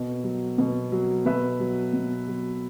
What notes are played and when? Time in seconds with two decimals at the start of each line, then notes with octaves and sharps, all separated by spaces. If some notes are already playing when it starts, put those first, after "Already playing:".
Already playing: B2
0.24 F#3
0.58 B2
0.92 F#3
1.26 B2 B4 E5
1.60 F#3
1.93 B2
2.28 F#3